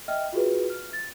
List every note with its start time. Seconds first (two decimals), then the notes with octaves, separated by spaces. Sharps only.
0.08 D#5 E5 G5 F6
0.33 F4 F#4 G#4 B4
0.70 F6
0.93 A6